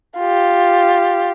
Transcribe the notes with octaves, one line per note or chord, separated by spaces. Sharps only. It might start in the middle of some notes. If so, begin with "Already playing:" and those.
F4 G4